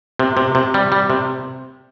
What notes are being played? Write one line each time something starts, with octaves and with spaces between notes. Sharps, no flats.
C3
C3
C3
G3
G3
C3